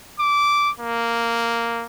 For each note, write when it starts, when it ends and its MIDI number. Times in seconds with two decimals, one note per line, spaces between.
0.20 0.70 86
0.80 1.86 58